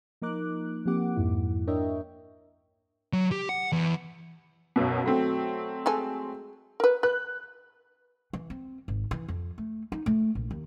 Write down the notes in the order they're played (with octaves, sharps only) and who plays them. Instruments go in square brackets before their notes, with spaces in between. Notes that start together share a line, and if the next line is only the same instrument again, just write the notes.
[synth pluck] F3 A#3 D#4 A#4 D6 F#6
F3 A#3 C4 G4 F#5 D6
C2 F2 G#2 E4
D4 A#4 C#5 D#5 E5 G5
[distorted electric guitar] F#3
G4
F#5
E2
[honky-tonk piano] B1 F#2 B2
F#3 A3 C4
[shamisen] G#3 A4 G#5
A#4 B4
[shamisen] B4 [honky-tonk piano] F#6
[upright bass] E3
C4
G#1
E3
F2
A3
D#4
A3
A#1
D#2